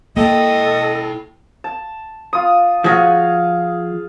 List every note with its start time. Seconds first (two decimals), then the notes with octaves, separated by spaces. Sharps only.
0.17 A#3 E4 A4 D#5 G5
1.64 A5
2.33 F4 D#6
2.84 F3 F#4 G#4 F5